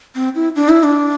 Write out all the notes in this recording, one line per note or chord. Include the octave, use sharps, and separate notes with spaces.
C4
E4
D4
E4
D4